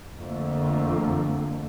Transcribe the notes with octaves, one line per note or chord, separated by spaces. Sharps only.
F2 D3 A3 A#3